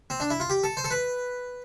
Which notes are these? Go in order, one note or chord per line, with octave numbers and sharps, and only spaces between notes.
C4
D4
E4
F4
G4
A4
C5
A4
B4